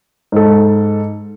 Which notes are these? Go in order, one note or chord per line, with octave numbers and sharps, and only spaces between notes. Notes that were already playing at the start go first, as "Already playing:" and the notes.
G#2 A4